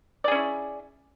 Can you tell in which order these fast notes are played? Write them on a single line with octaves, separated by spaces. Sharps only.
D5 G#4 C#4 E4